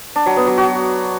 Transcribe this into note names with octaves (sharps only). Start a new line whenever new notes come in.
D4
F#3
B3
F#3
F#4